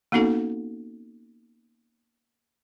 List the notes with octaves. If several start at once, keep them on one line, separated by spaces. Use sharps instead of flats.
A#3 B3 C#4 D#4 F#4 A4